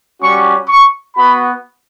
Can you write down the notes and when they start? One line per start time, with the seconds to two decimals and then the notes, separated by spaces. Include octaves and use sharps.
0.21 G3 C#4 F#4 C#6
0.68 C#6
1.16 B3 F#4 B5